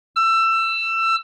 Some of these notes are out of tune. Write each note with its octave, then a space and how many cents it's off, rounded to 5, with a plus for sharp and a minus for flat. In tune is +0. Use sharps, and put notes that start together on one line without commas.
E6 +20